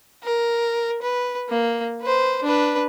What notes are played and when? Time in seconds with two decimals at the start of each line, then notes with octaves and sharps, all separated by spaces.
0.23 A#4
1.02 B4
1.49 A#3
2.01 B4 C5
2.43 D4 B4